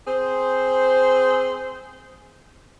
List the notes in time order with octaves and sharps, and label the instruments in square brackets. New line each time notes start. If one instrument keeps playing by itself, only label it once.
[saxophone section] C4 G#4 C5